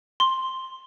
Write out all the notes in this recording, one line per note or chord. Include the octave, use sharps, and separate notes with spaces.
C6